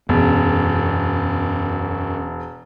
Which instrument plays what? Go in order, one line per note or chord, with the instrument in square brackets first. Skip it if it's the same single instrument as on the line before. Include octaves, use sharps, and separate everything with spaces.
[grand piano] E1 [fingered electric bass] F#2 B3 C#4